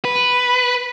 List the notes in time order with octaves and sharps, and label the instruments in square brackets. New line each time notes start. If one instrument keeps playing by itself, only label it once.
[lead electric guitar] B4